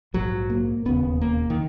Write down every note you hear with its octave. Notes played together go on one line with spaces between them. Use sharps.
A#1 G#2 F#3
A#3
E1 D#2 C#3 B3
A#3
D#3